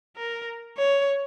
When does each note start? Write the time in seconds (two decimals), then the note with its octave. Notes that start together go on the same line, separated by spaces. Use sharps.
0.17 A#4
0.78 C#5